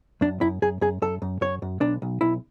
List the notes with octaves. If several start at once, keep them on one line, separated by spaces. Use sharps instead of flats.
F#2 D4
F#2 E4
F#2 G#4
F#2 G#4
F#2 A4
F#2
F#2 C#5
F#2
B1 D4
B1
B1 E4